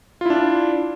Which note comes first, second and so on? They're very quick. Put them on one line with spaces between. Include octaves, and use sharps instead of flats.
F4 E4 D4